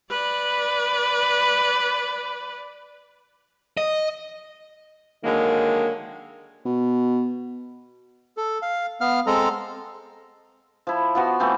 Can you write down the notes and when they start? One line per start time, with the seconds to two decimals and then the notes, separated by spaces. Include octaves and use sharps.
0.10 B4 D5
3.77 D#5
5.24 D3 D#3 F#3 G#3 A#3
6.66 B2
8.37 A4
8.62 F5
9.01 B3 F5 F6
9.27 G#3 C4 A4 A#5
10.87 F3 E4
11.15 F3 B3 F#4
11.39 E3 A3 C4 F4